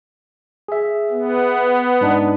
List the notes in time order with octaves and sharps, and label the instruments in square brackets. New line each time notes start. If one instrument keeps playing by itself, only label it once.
[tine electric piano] G#4 E5
[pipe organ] B3
[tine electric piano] G#2 D4 D#4